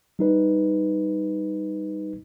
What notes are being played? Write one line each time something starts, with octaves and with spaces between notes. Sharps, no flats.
G3 D#4 B4